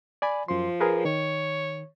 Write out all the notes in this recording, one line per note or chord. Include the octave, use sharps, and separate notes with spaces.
D5 G#5 B5
F#2 F3 C6
G#4 A#4 B4
D#3 C#5